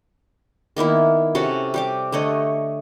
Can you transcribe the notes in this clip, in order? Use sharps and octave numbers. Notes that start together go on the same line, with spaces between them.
D#3 A#3 B3 E4
C3 C#4 F#4 A4
G3 G4 D6
D3 A3 C#5 D#5